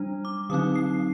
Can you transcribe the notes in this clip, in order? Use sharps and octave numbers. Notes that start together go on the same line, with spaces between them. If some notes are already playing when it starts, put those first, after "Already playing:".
Already playing: G3 D4
D6
D3 F#3 C4 D#4 D#6
C7